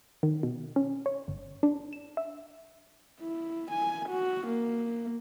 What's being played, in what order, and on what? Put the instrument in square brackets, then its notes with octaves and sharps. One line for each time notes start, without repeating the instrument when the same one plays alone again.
[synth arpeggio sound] D#3
B2
C#4
C#5
G1
D4
E7
E5
[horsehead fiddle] E4
G#5
F#4
A#3